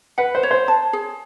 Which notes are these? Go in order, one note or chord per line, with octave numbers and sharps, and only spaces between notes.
B4 F#5
C5
C#5
C5
A5
G#4